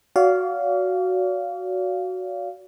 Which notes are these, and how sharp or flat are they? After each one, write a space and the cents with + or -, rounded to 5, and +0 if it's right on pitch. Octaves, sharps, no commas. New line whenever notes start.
F#4 +0 D5 -45 F5 -5